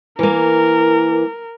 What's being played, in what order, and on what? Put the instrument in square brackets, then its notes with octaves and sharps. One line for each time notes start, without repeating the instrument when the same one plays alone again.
[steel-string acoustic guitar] E3 A#3 [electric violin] A#4